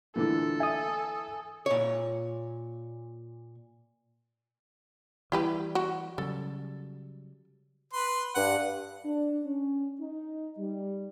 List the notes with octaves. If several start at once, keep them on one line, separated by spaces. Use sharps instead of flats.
A#2 D3 E3 A4
E5 G#5 D#6
A#2 C#5
E3 G3 E4 G4 B4
F#4
C#3 F#3 G3 A4
B4 C6
G2 F#5
D4
C#4
D#4
G3